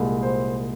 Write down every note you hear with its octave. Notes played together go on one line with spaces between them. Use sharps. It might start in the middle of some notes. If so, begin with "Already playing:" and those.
Already playing: C2 A#2 G#3
C5